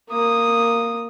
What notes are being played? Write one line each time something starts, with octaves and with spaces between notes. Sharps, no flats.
A#3 D#6